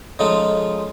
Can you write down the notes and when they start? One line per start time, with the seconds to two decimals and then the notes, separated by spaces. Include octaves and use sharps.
0.19 C#3 F3 G#3 D#4 F4 A4